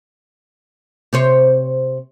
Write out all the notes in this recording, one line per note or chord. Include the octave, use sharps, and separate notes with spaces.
C3 C5 C#5